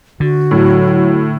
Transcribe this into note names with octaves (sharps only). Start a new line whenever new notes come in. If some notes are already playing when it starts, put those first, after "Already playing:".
D3 F#4
A2 F#3